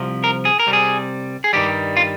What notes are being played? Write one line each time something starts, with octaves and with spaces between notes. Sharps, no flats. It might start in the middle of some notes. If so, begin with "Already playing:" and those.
Already playing: C2 C3 F3
A#4
G#4
A#4
C2 C3 G3
G#4
G#4
G2 D#3 G3 G4
F4